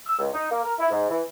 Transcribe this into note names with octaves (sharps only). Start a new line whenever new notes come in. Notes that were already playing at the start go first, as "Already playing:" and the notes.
E6
C#2
D#4
A#3
A#4
E4
G#2
E3